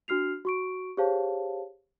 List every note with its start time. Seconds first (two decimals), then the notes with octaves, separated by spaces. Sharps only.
0.08 D4 F#4 F6 C7 F7
0.45 F#4 C#6 D7
0.97 G4 G#4 C5 C#5 F5 A5